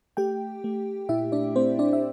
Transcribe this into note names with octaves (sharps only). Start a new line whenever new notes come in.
A3 G4 G5
A3
A#2 E4 E5
D4 D5
A3 C4 C5
D4 D5
E5